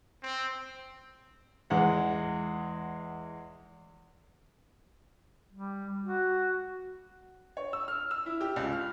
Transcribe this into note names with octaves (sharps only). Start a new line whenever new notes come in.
C4
E2 G#3 F#5
G3
F#4
C#5
E6
F6
E6
E4
G4
C#2
F6